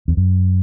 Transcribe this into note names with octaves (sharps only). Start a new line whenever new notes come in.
E2
F#2